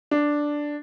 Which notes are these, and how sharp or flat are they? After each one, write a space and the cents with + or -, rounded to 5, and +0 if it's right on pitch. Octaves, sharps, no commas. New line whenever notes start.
D4 +0